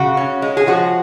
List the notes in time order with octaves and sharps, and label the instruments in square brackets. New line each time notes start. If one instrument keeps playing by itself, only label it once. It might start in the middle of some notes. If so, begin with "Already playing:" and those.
Already playing: [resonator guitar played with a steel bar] C#3 F#4
C#4
G#3
G#4
F3 F#4